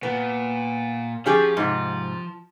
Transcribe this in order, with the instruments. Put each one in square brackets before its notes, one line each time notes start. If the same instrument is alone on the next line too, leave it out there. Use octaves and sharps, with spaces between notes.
[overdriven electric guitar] A#2 [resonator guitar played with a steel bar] B3
[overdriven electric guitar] F3 [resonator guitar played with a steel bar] C#4 G4 G#4
[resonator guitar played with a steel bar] G#2 C3